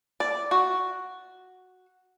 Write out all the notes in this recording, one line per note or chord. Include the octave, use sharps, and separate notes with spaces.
D5
F#4